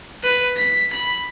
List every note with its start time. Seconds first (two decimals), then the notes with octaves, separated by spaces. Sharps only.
0.23 B4
0.57 B6
0.94 B5